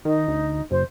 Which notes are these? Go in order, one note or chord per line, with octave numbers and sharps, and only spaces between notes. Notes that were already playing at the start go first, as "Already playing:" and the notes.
D#3 D#4
D2
F#1 C5